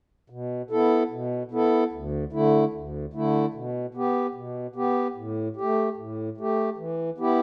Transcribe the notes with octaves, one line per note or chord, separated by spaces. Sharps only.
B2
B3 E4 A4
B2
B3 E4 A4
D2
D3 A3 E4
D2
D3 A3 E4
B2
B3 G4
B2
B3 G4
A2
A3 G4
A2
A3 G4
E3
B3 E4 G4